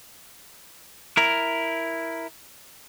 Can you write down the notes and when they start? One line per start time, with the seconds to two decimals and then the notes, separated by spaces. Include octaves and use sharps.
1.17 E4 A#4